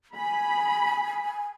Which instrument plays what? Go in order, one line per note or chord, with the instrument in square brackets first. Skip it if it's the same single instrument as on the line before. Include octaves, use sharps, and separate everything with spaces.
[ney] G#5 [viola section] B5